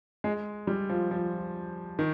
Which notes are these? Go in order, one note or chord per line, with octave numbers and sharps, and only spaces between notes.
G#3
G3
F3
F3
D#3